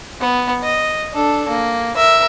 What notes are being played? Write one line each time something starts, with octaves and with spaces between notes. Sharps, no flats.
B3
D#5
D4 A4
A#3
A#4 E5